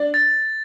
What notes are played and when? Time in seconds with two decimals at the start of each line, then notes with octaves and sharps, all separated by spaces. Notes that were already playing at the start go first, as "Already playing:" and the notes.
Already playing: D4 D5
0.14 A6